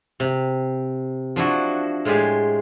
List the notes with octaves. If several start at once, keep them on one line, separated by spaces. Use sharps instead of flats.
C3
F3 D4 E4 F#4
A2 G#3 F4 G4 G#4